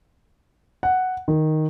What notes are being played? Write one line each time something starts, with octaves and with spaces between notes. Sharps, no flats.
F#5
D#3